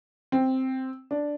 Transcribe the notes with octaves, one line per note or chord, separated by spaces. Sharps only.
C4
D4